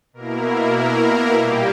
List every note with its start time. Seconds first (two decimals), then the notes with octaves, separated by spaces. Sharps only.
0.13 B2 A#3 E4 A#4
0.76 A#4
1.39 A#2 G3 A#3 G4